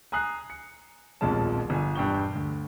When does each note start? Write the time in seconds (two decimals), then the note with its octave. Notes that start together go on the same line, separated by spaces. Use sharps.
0.12 G#5 A#5 D#6 F#6 C7
0.50 C#7
1.21 D#1 B1 F2 F3 G#3 A5
1.70 G1 G#5
1.95 E1 G2 G5 C#6 G7
2.36 D2